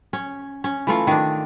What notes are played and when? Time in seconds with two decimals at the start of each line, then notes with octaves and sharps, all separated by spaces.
0.13 C#4
0.64 C#4
0.87 E3 A3 F4
1.07 D#3 D4